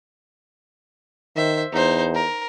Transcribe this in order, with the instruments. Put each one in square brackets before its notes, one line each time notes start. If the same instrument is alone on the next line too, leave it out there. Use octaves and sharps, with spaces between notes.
[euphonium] D#3 [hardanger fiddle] C5 E5
[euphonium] E2 [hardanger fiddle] D#4 C5
[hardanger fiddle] A#4